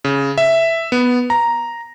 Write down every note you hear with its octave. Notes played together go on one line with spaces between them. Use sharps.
C#3
E5
B3
A#5